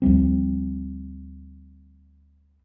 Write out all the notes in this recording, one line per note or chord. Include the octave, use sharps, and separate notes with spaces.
D2 F3 G3 C4